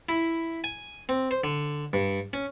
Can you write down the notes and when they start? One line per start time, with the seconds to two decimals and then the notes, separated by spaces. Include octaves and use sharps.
0.09 E4
0.64 G#5
1.09 C4
1.31 C5
1.44 D3
1.93 G2
2.33 C#4